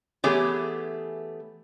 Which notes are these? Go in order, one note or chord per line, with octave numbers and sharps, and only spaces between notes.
E3 A3 B3 G4 G#4 C#5